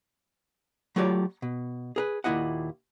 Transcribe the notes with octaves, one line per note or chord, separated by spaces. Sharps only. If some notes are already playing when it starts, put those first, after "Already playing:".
F#3 A3 F4 G4 C#5 D5
B2
G#4 A#4 B4
D#2 A#2 A#3 E4 D#5 F#5